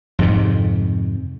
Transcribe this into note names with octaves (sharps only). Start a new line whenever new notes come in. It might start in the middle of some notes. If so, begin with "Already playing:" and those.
F2 G#2 C3